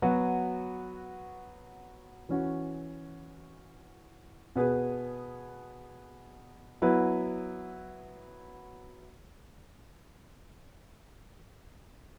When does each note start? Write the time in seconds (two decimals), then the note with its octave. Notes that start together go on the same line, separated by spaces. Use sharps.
0.02 F#3 B3 F#4
2.29 E3 C#4 F#4
4.56 B2 B3 G#4 B4
6.82 F#3 B3 E4 B4